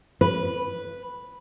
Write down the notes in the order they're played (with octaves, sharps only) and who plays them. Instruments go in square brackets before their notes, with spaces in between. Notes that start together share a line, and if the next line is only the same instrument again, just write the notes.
[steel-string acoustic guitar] B4